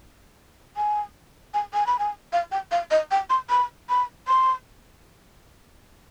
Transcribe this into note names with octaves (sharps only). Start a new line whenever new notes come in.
G#5
G#5
G#5
B5
G#5
F5
G5
F5
D#5
G5
C6
B5
B5
C6